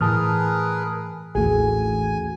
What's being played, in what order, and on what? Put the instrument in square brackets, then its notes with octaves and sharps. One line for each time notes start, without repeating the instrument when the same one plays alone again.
[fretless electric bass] A2 E3 [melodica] G#4 A#4 B4 [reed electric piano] A5 D#6 F6
[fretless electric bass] A1 D#2 E3 [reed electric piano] A3 F#4 G#4 [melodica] G#5